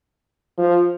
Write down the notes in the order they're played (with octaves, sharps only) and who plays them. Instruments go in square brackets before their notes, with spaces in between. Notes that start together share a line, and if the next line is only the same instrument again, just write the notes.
[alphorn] F3